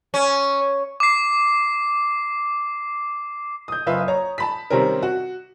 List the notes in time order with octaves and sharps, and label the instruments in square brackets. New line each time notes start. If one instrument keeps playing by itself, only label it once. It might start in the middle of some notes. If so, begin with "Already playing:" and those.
[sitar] C#4
[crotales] D6 C7
[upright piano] D#6 G6
F#1 F4 B4 E5
C#5 A#5
A5 B5 B6
C3 D#3 G3 C4 C#4 A#4
F#4